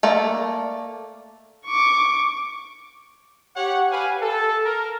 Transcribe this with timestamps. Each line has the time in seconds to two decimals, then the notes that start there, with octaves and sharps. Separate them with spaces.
0.03 A3 A#3 A4 D5
1.66 C#6 D6
3.56 G4 C#5 F#5
3.91 G4 B4 F5 G#5
4.21 A4
4.65 A#4